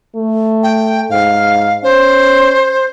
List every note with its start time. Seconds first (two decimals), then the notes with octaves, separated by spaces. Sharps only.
0.16 A3
0.63 G5
1.10 G#2 F5
1.84 C#4 C5